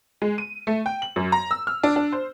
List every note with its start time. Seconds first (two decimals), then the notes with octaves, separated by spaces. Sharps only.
0.22 G#3
0.38 D#7
0.67 A3
0.86 G5
1.02 F#7
1.16 F#2
1.32 A#5
1.51 E6
1.67 F6
1.83 D4
1.96 D4
2.12 C5